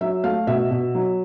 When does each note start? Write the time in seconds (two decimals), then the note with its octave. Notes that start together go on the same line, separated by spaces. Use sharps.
0.01 F#3 E5
0.24 A3 F5
0.47 B2 E5
0.71 B2
0.95 F#3